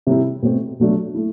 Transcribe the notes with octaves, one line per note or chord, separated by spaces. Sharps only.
C3 G3 C4 E4
B2 A3 C4
B2 F#3 A3 D4
A3 E4